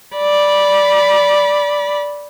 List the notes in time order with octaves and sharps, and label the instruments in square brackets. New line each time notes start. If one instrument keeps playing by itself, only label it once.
[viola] D5 B5